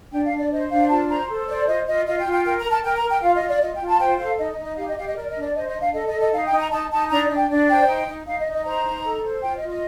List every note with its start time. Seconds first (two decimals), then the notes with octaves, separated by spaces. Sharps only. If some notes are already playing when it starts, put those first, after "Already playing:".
0.12 D4 G5
0.25 F5
0.31 D4
0.38 D5
0.51 C5 D#5
0.70 D4 F5
0.90 F4 A5
1.09 C5 A#5
1.29 A4
1.48 C5 D5
1.67 F4 D#5
1.87 F4 D#5
2.06 F4 D#5
2.19 G5
2.26 F4
2.32 G5
2.44 A#4 G5
2.58 A#5
2.65 A#4
2.71 A5
2.83 A#4 G5
2.96 A#5
3.03 A#4
3.09 G5
3.22 F4 F5
3.35 D#5
3.42 F4
3.48 D5
3.61 F4 D#5
3.75 G5
3.81 F4
3.87 A5
4.00 C5 G5
4.19 A4 F5
4.39 D#4 D#5
4.52 D#5
4.58 D#4
4.65 D#5
4.78 G4 F5
4.88 D#5
4.97 G4 F5
5.07 D#5
5.16 A#4 D5
5.29 D#5
5.36 D4
5.42 D5
5.55 C5 D#5
5.68 D#5
5.75 D4
5.81 F5
5.94 A4 D#5
6.07 D#5
6.13 A4
6.20 D#5
6.33 D#4 F5
6.46 G5
6.52 D#4
6.59 A#5
6.71 D#4 A5
6.91 D#4 A5
7.10 D4 A#5
7.30 D4
7.36 G5
7.49 D4
7.69 C5 G5
7.88 D#4
8.08 D#4
8.27 D#4 F5
8.39 D#5
8.46 D#4
8.52 D#5
8.65 C5 A#5
8.85 D#4
9.05 A4
9.23 C5
9.43 F4 G5
9.56 D#5
9.63 F4
9.69 D#5